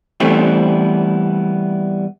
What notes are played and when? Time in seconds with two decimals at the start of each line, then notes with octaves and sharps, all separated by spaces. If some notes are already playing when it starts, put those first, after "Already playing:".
0.20 E3 G3 A3 B3 C4 E4